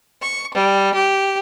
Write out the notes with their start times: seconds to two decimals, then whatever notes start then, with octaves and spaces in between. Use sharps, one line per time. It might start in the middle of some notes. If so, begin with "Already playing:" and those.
0.20 C#6
0.53 G3
0.94 G4